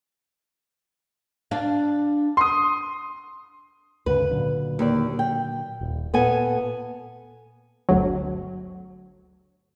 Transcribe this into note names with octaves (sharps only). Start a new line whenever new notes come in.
D4 F5
C6 D#6
D2 G#2 C#3 B4
A#2 D3 F#3
D#2 D5
G5
D#1
A#2 B3 A4 G#5
G1 D2 F#3